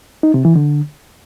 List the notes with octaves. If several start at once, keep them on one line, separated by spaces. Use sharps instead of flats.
D#4
C3
E3
D3